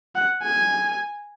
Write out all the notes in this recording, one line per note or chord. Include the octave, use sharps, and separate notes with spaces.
F#5
G#5